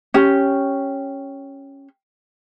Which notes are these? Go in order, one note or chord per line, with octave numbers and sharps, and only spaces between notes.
C#4 G4